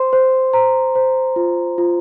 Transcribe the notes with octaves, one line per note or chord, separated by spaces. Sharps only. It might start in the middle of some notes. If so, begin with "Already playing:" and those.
Already playing: C5 C6
C5
C5 A#5
C5
F4
F4